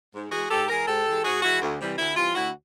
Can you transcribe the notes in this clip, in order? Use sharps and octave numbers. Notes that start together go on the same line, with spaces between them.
G#2
E3 G#3 F#4 G#4
G#2 G4 A4
E3 G#3 G#4 A#4
G#2 G4 A4
E3 G#3
G#2 F#4 G#4
E3 G#3 E4 F#4
D2
C3 E3 G3
D2 E4
C3 E3 G3 F4
D2 E4 F#4